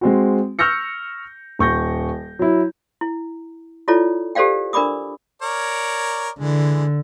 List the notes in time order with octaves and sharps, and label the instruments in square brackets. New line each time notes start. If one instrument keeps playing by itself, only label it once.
[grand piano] G#3 C4 F#4
C#6 E6 F6 G6 A#6 C#7
D#1 C#6 G6 A#6
F#3 E4
[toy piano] E4
E4 F4 A4 C#5 D5
G4 A4 C5 D5 F5 G5
D4 A#4 D5 B5 D6 D#6
[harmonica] A#4 C#5 D5
[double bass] D3 [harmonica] E3 G#3